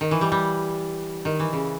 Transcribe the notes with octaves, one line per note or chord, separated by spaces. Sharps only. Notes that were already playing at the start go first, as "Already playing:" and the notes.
D#3
E3
G3
G3
D#3
E3
C#3